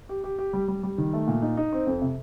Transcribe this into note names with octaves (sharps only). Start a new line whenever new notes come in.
G4
G4
G4
G3
G3
G3
D#3
A3
A#2
D#4
D#4
C4
F2
C3